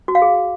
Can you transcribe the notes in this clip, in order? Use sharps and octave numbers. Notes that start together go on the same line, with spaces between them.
F#4
F5
G#4